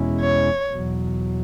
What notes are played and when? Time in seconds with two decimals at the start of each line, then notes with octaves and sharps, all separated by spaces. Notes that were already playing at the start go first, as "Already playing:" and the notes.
Already playing: E2 B2 G#3 C#4 E4
0.20 C#5
0.69 E2 B2 F#3